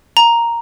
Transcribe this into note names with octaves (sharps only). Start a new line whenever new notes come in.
A#5